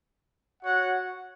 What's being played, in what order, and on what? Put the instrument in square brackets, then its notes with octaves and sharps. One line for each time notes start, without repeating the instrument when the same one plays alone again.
[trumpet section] F#4 C#5 F#5